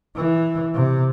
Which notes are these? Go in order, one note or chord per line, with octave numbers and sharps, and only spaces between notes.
E3
C3